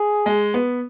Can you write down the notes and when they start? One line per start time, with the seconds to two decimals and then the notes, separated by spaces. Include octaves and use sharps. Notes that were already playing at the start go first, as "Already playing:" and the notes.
Already playing: G#4
0.26 G#3
0.54 B3